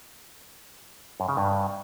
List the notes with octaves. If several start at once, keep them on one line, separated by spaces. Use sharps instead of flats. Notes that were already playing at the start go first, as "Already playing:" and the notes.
F#2
C#3
G2